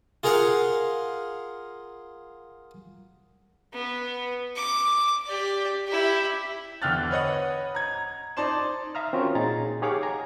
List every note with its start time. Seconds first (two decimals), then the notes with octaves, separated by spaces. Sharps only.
0.23 F4 G#4 A#4 F5 F#5
3.73 B3
4.56 D6
5.26 G4 D5
5.87 E4 G4
6.82 E2 D3 G5 F6 F#6 A6
7.11 B4 C#5 D#5 F#5
7.75 A#5 G#6
8.37 D#4 C5 D5 A5 C6 E7
8.95 E5 F5 A#5 D#6 F6
9.13 C4 C#4 F4 F#4 A#4 C#5
9.35 A#2 D#4 G#4 A#5 A6
9.82 G4 G#4 C#5 F5 F#5 D6
10.03 G#5 A#5